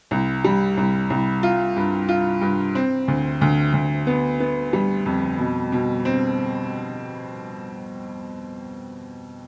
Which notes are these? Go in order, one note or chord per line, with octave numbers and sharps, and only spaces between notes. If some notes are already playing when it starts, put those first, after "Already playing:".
C2
G3
C2
C2
F4
G2
F4
G2
C4
D2
D2
D2
B3
B3
G3
F2
B2
B2
C4